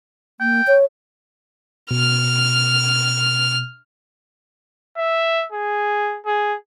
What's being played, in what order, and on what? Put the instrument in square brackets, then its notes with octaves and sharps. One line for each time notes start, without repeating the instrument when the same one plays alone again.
[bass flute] A#3 [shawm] G5
[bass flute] C#5
[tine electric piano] B2 [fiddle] F6
[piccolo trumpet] E5
G#4
G#4